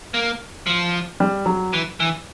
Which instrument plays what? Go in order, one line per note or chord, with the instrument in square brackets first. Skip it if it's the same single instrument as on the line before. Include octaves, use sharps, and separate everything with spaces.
[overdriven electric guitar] A#3
F3
[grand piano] G3
F#3
[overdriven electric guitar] E3
E3